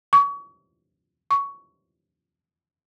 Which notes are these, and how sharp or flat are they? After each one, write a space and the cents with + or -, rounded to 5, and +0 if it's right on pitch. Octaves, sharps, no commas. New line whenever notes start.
C#6 +35
C#6 +10